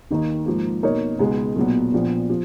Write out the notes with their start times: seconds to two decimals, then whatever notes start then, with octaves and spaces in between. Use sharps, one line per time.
0.11 D#2 D#3 A#3 D#4
0.46 G#2 F3 A#3
0.83 B2 A#3 D#4 A#4 C#5
1.19 C#2 B2 G#3 B3 D#4
1.56 B1 A#2 F#3 B3
1.94 A#1 A#2 F3 B3
2.30 F3